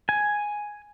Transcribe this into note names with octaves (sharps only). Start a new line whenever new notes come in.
G#5